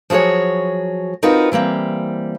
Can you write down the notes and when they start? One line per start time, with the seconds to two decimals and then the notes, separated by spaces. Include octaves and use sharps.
0.10 F3 F#3 F#4 G#4 C#5
1.23 C4 D#4 F4 F#4 A#4 B4
1.52 E3 G3 A#3 C4